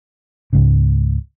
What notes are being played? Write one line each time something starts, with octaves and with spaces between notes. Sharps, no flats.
C#2 G#2 C#3